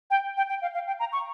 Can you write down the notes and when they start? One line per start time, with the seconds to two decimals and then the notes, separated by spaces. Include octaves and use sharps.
0.11 G5
0.37 G5
0.49 G5
0.62 F5
0.74 F5
0.87 G5
1.00 A#5
1.13 C#6